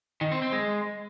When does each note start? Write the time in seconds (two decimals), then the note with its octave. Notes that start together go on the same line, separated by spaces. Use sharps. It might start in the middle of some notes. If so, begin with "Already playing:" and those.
0.21 D#3
0.32 C4
0.42 C4
0.52 G#3